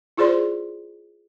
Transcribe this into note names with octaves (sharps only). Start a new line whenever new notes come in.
E4 F4 G#4 C5 D5 C6